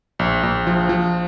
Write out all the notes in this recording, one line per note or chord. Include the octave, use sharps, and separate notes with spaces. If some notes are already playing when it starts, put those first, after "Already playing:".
A#1
A#1
F3
F3